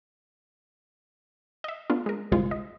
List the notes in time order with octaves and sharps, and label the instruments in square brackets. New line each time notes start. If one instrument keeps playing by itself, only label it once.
[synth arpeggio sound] D#5 E5
A3 B3 D4 F4
G#3 A#4
G1 C2 G#3 F4 C5
D#5